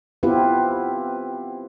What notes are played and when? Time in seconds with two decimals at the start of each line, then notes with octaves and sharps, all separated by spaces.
0.23 B3 C4 E4 F4 G4 B4